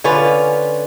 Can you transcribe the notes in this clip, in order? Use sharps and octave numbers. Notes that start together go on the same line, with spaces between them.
D3 C#4 F4 B4